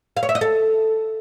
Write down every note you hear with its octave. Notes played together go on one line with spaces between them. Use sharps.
F5
C#5
E5
D#5
A4